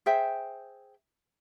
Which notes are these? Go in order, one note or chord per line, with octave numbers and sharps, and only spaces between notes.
G#4 C5 E5 G5